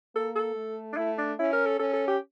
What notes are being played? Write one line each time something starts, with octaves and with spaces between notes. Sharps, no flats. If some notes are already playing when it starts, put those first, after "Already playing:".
A#3 A4
A4
A3
D4
A3 E4
D4
C#4 E4
A#4
A4
C#4 A4
A4
G4